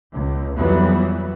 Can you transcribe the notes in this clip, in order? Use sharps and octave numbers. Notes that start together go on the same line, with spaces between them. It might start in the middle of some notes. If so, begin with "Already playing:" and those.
C#2
F2 E3 F#3 G3 B3